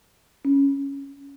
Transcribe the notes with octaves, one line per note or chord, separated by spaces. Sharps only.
C#4